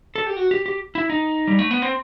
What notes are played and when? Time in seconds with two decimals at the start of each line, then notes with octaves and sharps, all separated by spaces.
0.15 A4
0.27 G4
0.37 F#4
0.51 G4
0.66 G4
0.95 E4
1.10 D#4
1.47 G3
1.59 A3
1.71 B3
1.82 C4